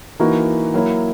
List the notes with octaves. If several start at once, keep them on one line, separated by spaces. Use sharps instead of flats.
E3 A#3 D#4 F#4
F#3 A#3 E4